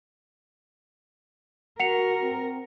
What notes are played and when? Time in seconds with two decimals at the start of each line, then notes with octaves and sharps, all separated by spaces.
1.80 F#4 A#4 F#5 C#7 F7
2.21 C4